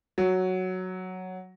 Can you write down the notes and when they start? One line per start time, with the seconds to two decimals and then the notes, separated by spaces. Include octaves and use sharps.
0.18 F#3